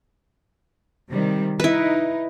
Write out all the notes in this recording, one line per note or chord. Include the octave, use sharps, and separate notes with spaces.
C3 D#3 G3
D#4 E4 B4